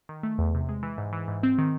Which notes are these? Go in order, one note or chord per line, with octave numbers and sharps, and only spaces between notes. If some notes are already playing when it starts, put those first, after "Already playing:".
D#3
A3
E2
C3
G#3
E3
G#2
E3
G#2
C4
D#3